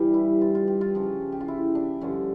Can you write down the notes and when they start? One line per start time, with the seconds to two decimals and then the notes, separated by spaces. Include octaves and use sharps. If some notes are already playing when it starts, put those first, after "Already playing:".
Already playing: G2 E3 G3
0.14 E4
0.41 F4
0.55 F4
0.67 G4
0.81 F4
0.95 C#3 F3
1.32 G4
1.41 F4
1.48 E4
1.75 D4
2.01 G2 D3 F3 C#4